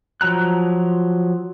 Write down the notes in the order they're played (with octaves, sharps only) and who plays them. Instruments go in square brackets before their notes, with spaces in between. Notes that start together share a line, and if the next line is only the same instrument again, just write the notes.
[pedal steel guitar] F3 F#3 A#5 F#6